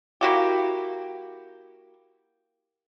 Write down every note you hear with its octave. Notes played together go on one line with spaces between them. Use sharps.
A#3 E4 F#4 G4